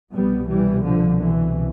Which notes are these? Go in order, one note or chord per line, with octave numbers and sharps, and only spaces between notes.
C2 B2 G3 B3
E3 G3
D3 F3
E3